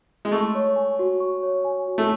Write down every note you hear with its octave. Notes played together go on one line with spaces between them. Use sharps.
G#3
A3 C#6
C#5
G#5
F#4
C#6
C#5
G#5
F#4
A3